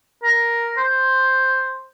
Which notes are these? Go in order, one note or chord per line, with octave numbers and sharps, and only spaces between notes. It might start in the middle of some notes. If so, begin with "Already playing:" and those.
A#4
C5